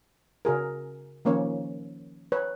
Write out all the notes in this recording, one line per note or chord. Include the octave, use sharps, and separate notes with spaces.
C#3 F#4 G#4 A#4
D#3 F3 A#3 C#4 C#5
B4 C#5